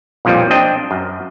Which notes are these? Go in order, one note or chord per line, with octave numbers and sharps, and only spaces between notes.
B1 F2 A#2 F3 G3
C4 D4 D#5 G5
F#2